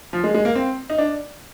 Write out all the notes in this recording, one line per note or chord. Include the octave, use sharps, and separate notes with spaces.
F3
G#3
G#3
A#3
C4
D#4
D4